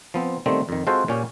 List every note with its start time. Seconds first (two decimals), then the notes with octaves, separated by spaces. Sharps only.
0.14 F3 B3 C4
0.46 D#3 G3 A3 B3 C4
0.69 F2 D#3
0.87 G#3 C4 F4 F#4 A4 C5
1.08 A#2 C#4 G4